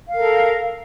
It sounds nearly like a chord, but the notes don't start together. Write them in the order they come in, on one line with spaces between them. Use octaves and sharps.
F5 A#4 A4